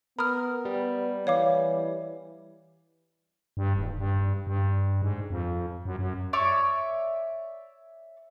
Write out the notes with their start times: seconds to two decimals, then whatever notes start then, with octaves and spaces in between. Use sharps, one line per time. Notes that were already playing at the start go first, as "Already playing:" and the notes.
0.19 B3 A#4 B5 D#6 F6
0.65 G3
1.27 E3 C#5 F5 D6
3.57 G2
3.76 D#1
3.98 G2
4.47 G2
5.02 G#2
5.30 F2
5.86 F#2
5.99 F#2
6.33 C#5 D5 E5 C#6